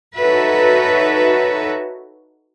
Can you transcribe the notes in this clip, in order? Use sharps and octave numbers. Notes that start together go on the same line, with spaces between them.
D#4 F#4 A4 B4 C#5 E5